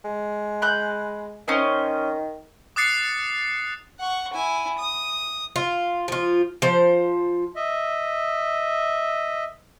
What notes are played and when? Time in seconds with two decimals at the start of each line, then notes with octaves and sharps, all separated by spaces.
0.05 G#3
0.62 B5 F#6 G6
1.48 D#3 C#4 C5 D#5
2.76 D6 D#6 F#6 A6 C7 C#7
4.00 F#5 C#6
4.34 E4 G#5
4.78 D#6
5.56 F4
6.08 F3 F4
6.62 F3 C5
7.56 D#5 E5